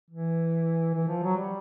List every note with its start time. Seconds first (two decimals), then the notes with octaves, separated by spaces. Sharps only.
0.10 E3
0.94 E3
1.08 F3
1.23 F#3
1.36 G3